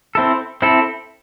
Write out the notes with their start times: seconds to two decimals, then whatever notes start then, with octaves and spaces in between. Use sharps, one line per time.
0.15 C4 E4 A4
0.62 C4 E4 A4